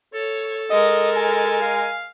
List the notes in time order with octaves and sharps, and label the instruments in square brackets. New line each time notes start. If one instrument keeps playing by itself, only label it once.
[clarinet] A4 [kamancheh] C#5
[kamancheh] G#3 A#4 [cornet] D#5
[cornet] G#5
[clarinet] F5